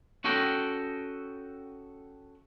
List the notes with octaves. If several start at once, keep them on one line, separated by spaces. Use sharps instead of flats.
C#4 F#4 A4 D#5 G5